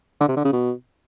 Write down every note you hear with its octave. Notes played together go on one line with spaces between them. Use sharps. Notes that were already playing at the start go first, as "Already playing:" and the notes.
D3
C3
D3
C#3
B2